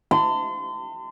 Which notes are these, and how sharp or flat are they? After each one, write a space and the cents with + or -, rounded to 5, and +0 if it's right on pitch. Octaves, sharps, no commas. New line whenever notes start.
A5 +40 C6 -35